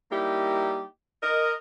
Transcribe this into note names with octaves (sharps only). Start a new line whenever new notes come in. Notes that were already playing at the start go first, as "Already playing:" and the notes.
G3 A#3 D#4 E4 G4
A#4 D#5